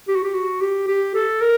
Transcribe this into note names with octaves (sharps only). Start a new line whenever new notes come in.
G4
F#4
G4
F#4
G4
G4
A4
A#4